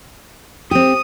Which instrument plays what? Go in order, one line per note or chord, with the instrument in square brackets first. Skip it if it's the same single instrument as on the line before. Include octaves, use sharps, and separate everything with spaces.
[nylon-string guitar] C4 G4 [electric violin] D#6